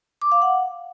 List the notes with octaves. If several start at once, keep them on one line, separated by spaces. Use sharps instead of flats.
D6
F5
F#5